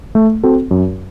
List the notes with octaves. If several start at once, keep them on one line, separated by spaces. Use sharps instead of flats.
A3
C4 F#4 A4
F#2